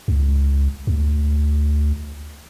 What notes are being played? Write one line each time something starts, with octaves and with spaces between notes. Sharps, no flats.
C#2
D2